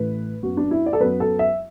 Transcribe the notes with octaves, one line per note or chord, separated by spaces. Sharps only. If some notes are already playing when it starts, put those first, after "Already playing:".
Already playing: A1 A2 A3 B4
F#2 F#3 B3 F#4
D4
E4
D5
A4
F#2 F#3 B3 B4
A4
E5